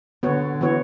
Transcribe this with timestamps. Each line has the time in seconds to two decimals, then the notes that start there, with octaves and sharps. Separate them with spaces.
0.23 D3 B3 F#4 C#5
0.61 E3 B3 F#4 C#5